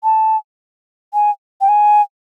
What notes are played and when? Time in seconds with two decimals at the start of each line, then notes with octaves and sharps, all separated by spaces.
0.04 A5
1.14 G#5
1.61 G5
1.69 G#5